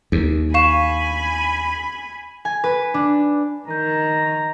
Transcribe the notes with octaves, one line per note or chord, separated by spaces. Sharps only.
D#2
F5 G#5 B5 C#6 E7
G#5
B4
D4
D#3 A#4 A#5 G6